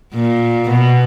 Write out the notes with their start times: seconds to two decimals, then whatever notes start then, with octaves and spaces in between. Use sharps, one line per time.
0.14 A#2
0.69 B2